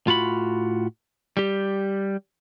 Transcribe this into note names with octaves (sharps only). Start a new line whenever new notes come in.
A2 F4 F#4 B5
G3 G4